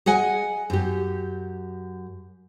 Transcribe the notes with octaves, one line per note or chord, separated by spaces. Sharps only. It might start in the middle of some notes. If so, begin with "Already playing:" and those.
G#4 D#5 F#5 G#5
F#2 G4